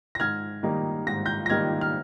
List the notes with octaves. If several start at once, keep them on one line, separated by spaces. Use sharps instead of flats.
A#6
G#2 F6 G#6
D#3 G3 A#3 D#4
G#2 A#6
G6 A#6
A#6
D#3 G3 A#3 D#4 F6 G#6
F6